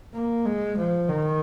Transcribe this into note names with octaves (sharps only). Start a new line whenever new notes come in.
A#3
G#3
F3
D#3